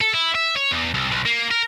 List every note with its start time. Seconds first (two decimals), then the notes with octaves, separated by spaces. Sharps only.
0.01 A4
0.14 E4
0.35 E5
0.56 C#5
0.71 E2
0.94 C2
1.11 B1
1.26 A#3
1.51 A#4